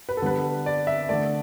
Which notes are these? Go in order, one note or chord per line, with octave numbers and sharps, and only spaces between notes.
B4
A4
D3 G3 B3 B4
D5
E5
D3 A3 D5